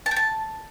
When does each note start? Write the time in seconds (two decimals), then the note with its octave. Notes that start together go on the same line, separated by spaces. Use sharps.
0.06 A5
0.11 G5
0.16 A5